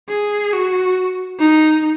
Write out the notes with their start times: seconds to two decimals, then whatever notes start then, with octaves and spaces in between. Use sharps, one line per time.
0.09 G#4
0.53 F#4
1.39 D#4